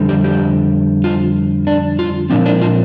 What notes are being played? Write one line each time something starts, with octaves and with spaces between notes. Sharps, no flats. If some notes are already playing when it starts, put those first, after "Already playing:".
Already playing: F2 D3 G3
G4
G4
F4
D4
F4
A#2 F3 C4 D4
D4
F4